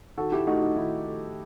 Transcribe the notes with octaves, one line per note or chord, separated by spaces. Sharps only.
D#3 F#4 A4
E4 G4
A3 D#4 F#4
D#4
D#3 E4
A3